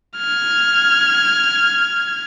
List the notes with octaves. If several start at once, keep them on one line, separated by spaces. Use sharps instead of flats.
F6 G#6